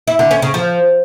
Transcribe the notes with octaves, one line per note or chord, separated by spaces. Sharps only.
E4
D3
C#4
C#3
F3